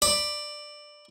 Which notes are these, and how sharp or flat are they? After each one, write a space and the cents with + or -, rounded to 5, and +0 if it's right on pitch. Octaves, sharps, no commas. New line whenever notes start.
D5 +10 B5 +0